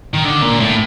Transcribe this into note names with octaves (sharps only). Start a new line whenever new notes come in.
D#3
D3
A#2
A2